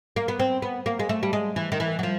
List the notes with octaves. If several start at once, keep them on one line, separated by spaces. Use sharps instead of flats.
A#3
B3
C4
B3
A#3
G#3
A3
G3
G#3
E3
D#3
E3
F#3
F3